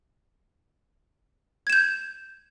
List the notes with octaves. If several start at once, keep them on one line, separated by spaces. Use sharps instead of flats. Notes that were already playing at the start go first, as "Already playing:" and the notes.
G6 G#6 E7